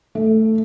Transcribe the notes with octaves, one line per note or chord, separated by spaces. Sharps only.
A3